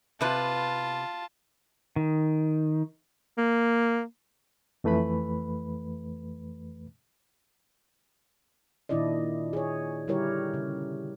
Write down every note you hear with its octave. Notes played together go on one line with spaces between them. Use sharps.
C3 F4 B4 A5
D#3
A#3
F2 E3 A3 B4 B5
A#2 D#3 D4 E4 D5 D#5
G#4 C#5
D3 G3 E4 G4 A#4 C#5
C#3